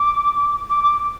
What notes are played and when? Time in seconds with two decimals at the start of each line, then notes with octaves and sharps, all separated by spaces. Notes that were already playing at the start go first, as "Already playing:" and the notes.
Already playing: D6
0.69 D6
0.83 D6